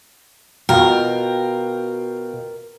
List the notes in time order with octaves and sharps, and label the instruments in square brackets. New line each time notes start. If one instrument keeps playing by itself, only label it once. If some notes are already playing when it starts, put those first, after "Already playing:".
[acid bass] B2 [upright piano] F4 F#4 G5 [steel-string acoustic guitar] A#4